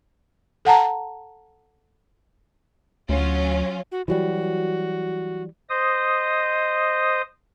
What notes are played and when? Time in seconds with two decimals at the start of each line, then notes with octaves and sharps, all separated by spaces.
0.65 A4 F#5 A5 A#5
3.09 D2 F#3 C#4 F4
3.92 F#4
4.08 E3 F#3 G3 F#4
5.69 C5 D#5 D#6